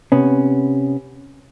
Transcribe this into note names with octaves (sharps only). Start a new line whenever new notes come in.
C3 B3 C#4